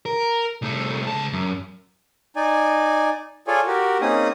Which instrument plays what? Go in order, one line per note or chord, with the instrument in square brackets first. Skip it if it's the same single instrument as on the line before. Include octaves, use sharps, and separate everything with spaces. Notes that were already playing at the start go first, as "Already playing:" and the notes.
[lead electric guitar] A#4
C2 A3
C#2 A5
F#2
[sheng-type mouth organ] D#4 D5 G#5
F4 G#4 A4 C#5 D5 G#5
F#4 G4 A#4
A#3 C4 C#4 D#4 G#4 D#6